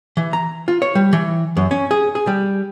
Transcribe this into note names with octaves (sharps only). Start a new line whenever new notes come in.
E3
A#5
F4
C#5
G3
E3
F#2
C#4
G#4
G#4
G3